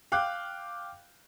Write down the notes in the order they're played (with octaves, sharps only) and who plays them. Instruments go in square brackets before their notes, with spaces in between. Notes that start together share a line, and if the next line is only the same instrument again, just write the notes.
[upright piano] F5 G5 D6 F#6